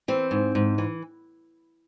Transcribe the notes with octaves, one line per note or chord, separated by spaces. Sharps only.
E3 C4
G#2
G#2
E3